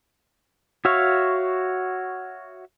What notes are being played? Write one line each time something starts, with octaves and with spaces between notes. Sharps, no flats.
F#4 C#5 E5 F5